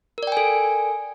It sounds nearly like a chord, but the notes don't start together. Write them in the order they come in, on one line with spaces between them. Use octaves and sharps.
A#4 D5 G5 G#5 A4